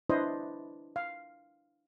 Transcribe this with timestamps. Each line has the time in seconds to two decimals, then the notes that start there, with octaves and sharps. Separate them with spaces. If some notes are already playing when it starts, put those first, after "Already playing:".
0.09 D4 E4 B4 C5 D#5
0.96 F5